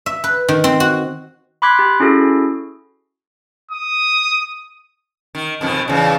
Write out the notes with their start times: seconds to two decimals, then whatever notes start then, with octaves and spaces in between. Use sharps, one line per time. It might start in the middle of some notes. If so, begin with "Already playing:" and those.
0.06 E5
0.24 B4
0.49 D#3
0.64 C4
0.80 F#4
1.62 B5 C6 D6 F#6 G#6 B6
1.79 G4
2.00 C#4 E4 F#4 G#4 A4
3.71 D#6
5.35 D#3
5.61 F2 B2 D#3
5.88 E2 C#3